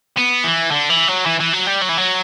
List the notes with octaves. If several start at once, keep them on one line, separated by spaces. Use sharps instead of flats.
B3
E3
D3
E3
F#3
E3
E3
F#3
G3
F#3
E3
F#3